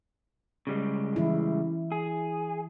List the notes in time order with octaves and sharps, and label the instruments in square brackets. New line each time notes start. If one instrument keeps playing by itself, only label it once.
[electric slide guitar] C#3 G3 G#3
[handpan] E3 E4
[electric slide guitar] G#4